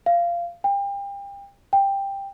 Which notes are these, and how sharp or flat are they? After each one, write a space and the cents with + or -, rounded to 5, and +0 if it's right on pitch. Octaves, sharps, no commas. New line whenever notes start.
F5 -20
G5 +35
G5 +10